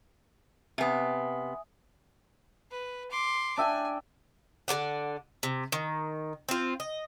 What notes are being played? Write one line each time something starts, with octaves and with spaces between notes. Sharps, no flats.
C3 B3 E5 G#5 D#6
B4
C6 D6
D4 E5 G5 G#5
D3 A4 D5 F#5
C3
D#3
C4 F4
D#5